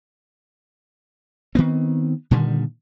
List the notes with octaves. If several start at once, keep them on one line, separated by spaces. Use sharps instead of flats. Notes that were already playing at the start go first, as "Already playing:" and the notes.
D#3 B3 C4
A#2 D3 D#3 G3